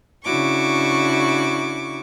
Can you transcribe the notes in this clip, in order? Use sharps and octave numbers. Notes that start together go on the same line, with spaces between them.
C#3 D4 E4 F#4 C#6 D6